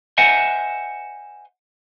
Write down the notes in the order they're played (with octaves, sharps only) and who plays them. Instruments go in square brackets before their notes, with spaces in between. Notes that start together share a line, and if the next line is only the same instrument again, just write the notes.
[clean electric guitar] C5 D#5 E5 F#5 G#5